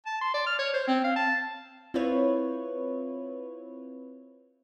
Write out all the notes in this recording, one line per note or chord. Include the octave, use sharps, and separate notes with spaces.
A5
C6
D5
F6
C#5
C5
C4
F5
A5
C4 E4 F4 B4 C#5